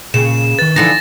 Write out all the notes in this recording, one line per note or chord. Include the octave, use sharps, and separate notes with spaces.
A#2 C#3 E7
D#3 B4 A6
D3 E3 F3 D#4 A#6